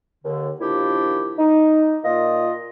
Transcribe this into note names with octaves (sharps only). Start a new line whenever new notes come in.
D#2 D3
A#2 D#3 F3 D4 E4 G4
D#4
A#2 F4 D#5